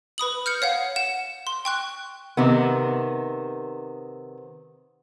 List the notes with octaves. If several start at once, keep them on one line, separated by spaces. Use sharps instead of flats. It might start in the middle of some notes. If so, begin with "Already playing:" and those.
B4 B5 D#6 F#7
F6 G6 C#7
C#5 F5 F#5
F#5 E7
C6
G5 C#6 F#6
C3 D#3 B3